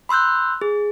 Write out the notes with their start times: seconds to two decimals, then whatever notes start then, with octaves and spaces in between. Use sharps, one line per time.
0.09 B5 C6 E6 F#6 G6
0.62 G#4